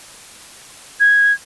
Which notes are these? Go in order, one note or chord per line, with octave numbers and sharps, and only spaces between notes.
G#6